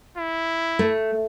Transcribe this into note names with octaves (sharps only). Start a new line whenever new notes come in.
E4
A3